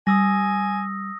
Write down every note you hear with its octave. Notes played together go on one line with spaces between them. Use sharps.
G3 G#5 D#6 E6 A#6